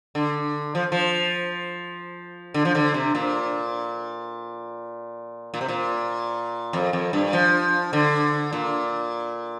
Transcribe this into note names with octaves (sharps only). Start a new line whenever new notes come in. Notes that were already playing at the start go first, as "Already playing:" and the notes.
D3
F3
F3
D3
F3
D3
C3
A#2
A#2
C3
A#2
F2
F2
G2
F3
D3
A#2